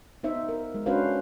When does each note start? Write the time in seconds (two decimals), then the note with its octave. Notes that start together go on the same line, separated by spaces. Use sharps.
0.23 B3 D#4 C5 E5
0.49 A#4
0.75 G#3
0.86 C#4 D4 F#4 B4 C5 F5